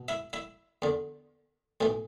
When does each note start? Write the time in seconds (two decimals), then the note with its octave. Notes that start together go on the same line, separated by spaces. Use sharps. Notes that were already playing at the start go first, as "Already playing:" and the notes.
Already playing: B2
0.08 E4 E5
0.33 E4 E5
0.82 E2 D3
1.81 B1 A2 E3